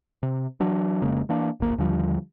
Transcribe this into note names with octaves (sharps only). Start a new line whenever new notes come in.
C3
E3 F#3 D4
F1 C#3 G#3 A#3
E3 A#3 D4
D1 G#1 A#3
D#2 D3 F3 G3